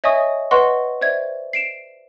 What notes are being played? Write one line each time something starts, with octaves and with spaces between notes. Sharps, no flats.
C#5 D#5 E5 G#5 C#6 D#6
B4 D#5 F#5 C6 C#6
C5 D5 E5 G#6
C7 D7 E7